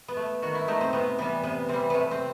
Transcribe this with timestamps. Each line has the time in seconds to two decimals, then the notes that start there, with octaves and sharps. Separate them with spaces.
0.08 B3
0.17 A3
0.42 D#3 F#4
0.55 E4
0.68 A3 D#4
0.81 C4
0.93 C3 B3
1.18 E3 G3 B3
1.43 C3 B3
1.69 E3 G3 C4
1.90 C3 A3 B3
2.11 C4